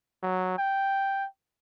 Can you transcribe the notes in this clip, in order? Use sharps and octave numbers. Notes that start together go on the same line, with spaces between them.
F#3
G5